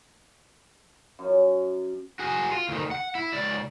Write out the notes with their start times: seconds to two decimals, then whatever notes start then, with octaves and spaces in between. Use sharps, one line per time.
1.19 F#2
2.19 F#4 G#4
2.52 F4
2.68 D2 D#3
2.91 F#5
3.15 E4
3.33 C#2 D5